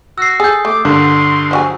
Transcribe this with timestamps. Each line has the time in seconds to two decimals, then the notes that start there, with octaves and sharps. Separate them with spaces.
0.18 F#4 E6 C7
0.40 G#4 A4 D#6 G6
0.65 A3 D6
0.85 G2 D3 A#3 C6
1.51 F3 F#3 G#5